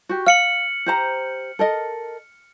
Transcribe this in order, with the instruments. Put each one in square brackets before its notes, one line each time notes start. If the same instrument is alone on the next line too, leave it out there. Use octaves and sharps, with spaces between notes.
[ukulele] F#4 G4
[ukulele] F5 [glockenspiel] F6 C#7 F#7
[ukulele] G4 C5 A#5
A4 A#4 D#5